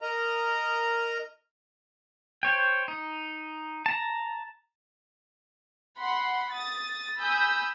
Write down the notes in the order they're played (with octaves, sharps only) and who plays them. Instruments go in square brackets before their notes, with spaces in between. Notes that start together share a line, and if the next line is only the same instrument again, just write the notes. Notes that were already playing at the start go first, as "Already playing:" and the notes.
[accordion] A#4 D#5 A#5
[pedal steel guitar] C5 C#5 G5
D#4
A5 A#5
[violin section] F#5 B5 C6
D#6 A6
G#5 B5 D#6 E6 G6